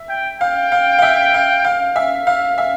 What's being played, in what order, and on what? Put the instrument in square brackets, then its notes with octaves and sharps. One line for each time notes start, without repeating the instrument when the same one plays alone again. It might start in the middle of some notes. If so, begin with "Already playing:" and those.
Already playing: [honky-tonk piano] E5
[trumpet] G5
[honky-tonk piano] F5 [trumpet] G5
[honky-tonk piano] F5
F5
E5
F5
F5
E5
[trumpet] E5 [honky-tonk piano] F5
[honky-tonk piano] E5